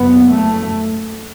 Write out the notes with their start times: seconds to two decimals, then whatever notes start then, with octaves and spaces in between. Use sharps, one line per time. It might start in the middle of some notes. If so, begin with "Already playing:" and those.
Already playing: F#1 F#2 B3
0.28 A3